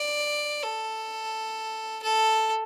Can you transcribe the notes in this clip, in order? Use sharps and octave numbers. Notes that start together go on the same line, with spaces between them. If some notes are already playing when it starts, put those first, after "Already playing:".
Already playing: D5
A4
A4